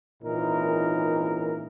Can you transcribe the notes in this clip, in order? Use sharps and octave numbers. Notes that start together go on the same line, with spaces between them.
G#1 A#2 E3 C#4 D#4 A#4